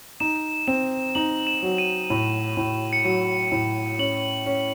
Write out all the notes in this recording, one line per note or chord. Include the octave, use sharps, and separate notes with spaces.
D#4 E7
C4 E7
D#4 F#7
E7
F#3
D#7
A2
A2
C#7
F#3 D#7
A2
C#4 F#7
C#4